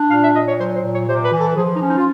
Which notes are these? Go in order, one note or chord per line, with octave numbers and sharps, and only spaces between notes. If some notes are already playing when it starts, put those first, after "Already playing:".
Already playing: D4
A#2 F5
E5
A#2 D#5
C#5
F#3 C5
C5
A#2
C#5
C3 C5
B4
E3
A4
F3 G#4
D#4
C#4
D#4
F4